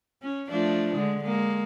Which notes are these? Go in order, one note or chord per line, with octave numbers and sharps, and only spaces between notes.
C#4
F3 A3 D4
D3 G#3
G#3 A#3